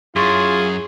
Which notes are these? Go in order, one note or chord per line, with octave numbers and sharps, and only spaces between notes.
F#2 E4 F4 G#4 C#5 C6 C#6 A6